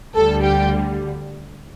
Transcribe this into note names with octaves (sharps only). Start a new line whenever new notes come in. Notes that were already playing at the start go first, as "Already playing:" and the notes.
D2 D3 G3 A4
G4